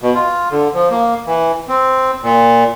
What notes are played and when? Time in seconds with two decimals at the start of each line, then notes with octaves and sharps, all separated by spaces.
0.02 B2
0.14 F4
0.51 D3
0.74 F3
0.90 A#3
1.26 E3
1.69 C4
2.23 A#2